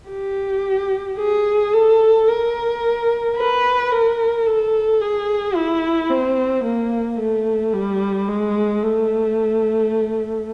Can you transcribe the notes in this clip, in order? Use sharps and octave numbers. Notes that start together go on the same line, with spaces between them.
G4
G#4
A4
A#4
B4
A#4
A4
G#4
E4
C4
A#3
A3
G3
G#3
A3